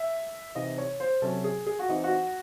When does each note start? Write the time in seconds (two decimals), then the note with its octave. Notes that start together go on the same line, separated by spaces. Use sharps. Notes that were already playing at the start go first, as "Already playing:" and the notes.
Already playing: E5
0.55 C3 E3 C4 D#4 D#5
0.78 C#5
1.00 C5
1.22 C3 F#3 C#4 A4
1.44 G#4
1.66 G#4
1.79 F#4
1.89 E3 C4 D#4
2.04 F#4